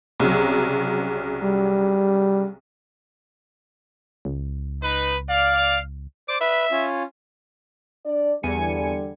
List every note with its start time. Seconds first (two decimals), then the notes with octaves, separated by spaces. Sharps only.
0.20 C2 C#3 F#3
1.44 G3
4.25 C#2
4.83 D#4 B4
5.29 D5 F5
6.29 C5 D5 D6
6.41 B4 E5
6.71 C#4 F4
8.05 D4 D5
8.43 E2 D3 G3 G#5 C#7